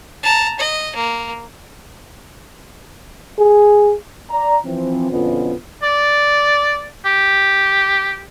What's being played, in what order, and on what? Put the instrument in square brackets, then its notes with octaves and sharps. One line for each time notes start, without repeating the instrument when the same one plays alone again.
[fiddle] A5 A#5
D#5
A#3
[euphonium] G#4
[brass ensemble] D5 A#5
E3 F3 C4
F2 B2 D3 B3 C#4 F4
[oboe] D5
G4